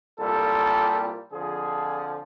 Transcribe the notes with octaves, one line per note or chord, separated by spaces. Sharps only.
C2 A#2 G3 A4
F2 D3 F3 G#4